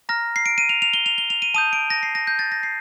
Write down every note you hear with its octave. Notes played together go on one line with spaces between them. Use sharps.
A#5 F6 A#6
C7
D7
D#7
F7
F7
G7
F7
G7
F7
D#7
A5 D#6 G6 D#7
D7
A#6
C7
A#6
G6
A6
A#6
C7